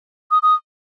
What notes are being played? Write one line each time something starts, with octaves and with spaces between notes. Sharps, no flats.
D#6
D#6